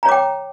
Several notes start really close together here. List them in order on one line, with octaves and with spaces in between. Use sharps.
A#5 C#5 D6 G5